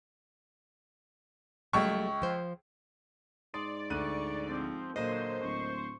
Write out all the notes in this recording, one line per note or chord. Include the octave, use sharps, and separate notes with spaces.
C#2 F#3 G3 A3 C#6
F3 C5
G#2 D5 C6 D#6
D2 C#6 F#6 D#7
F3 C4
A#2 D3 F#3 A#3 C5 D#5
D1 A2 C#6